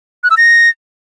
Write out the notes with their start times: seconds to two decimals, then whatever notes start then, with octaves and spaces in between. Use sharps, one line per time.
0.24 F#6
0.30 E6
0.37 A#6